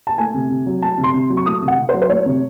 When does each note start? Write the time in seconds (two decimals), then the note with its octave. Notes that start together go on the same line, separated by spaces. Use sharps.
0.07 A5
0.18 A3 G#5
0.34 C3
0.50 C3
0.66 F#3
0.82 A3 A5
0.98 C3
1.04 C6
1.14 C3
1.30 F#3
1.37 C#6
1.46 A3 D#6
1.62 C3
1.68 F#5
1.78 C3
1.89 C5
1.94 F#3
2.02 C5
2.10 A3 C#5
2.26 C3